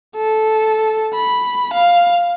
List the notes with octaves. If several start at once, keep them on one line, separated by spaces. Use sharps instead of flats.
A4
B5
F5